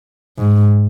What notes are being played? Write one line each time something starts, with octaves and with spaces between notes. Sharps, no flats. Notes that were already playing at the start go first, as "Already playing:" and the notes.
G#2